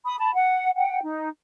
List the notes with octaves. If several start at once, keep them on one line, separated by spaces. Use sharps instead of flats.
B5 D#6
A5 B5
F#5
F#5 G5
D#4